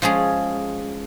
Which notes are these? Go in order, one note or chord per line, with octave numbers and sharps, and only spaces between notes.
F3 G#3 C#4 G#4